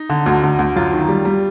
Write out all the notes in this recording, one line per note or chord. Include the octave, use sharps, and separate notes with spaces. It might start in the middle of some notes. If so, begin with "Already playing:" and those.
Already playing: D#4
D3
D2
D2
D2
F#2 F4
D#3
G3
G3